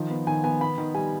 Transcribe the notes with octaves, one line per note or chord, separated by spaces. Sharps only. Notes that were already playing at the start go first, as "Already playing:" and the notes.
Already playing: D#3 F3
B3
D#3 G#5
B3 G#5
B3 B5
D#3
G3 G#5